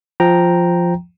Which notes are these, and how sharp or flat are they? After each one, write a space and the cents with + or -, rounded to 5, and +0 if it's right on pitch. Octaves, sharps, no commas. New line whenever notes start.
F3 +0 G5 +0 A#5 +0